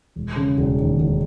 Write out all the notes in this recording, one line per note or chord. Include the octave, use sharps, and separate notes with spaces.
E1
C#3
E1
D#2
E1